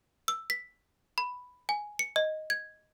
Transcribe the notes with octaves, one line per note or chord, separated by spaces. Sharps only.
E6
B6
B5
G#5
C#7
D#5
G#6